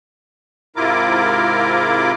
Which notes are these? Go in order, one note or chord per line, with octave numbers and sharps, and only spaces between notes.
G#2 C3 E4 F4 A#4 D6